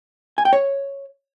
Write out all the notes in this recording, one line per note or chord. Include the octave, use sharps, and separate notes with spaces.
G#5
G5
C#5